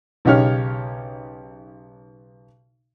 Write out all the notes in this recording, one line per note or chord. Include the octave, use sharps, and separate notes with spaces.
B1 C#3 D#4 G4 C#5 F6